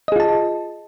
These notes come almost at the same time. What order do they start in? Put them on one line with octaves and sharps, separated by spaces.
D#5 G#4 F4 A5